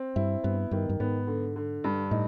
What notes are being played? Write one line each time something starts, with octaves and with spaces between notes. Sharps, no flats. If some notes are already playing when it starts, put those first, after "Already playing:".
Already playing: C4
G2 E4
G2 B3
G2 D#3
G2
G#2 B3
D3
D3
G2
A2 D#4